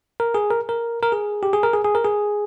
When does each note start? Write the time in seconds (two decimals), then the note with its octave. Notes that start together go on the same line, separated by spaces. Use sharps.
0.20 A#4
0.35 G#4
0.50 A#4
0.69 A#4
1.03 A#4
1.12 G#4
1.43 G4
1.53 G#4
1.63 A#4
1.74 G#4
1.85 G#4
1.95 A#4
2.05 G#4